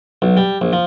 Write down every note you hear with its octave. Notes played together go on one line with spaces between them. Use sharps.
B1
G3
A#1
F3